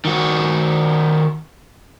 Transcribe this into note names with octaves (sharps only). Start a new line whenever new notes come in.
D#3 F#4